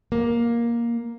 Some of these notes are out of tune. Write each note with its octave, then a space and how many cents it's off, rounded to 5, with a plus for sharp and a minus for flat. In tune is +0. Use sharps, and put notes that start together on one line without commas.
A#3 +10